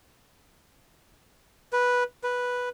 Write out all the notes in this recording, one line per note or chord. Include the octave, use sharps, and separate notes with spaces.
B4
B4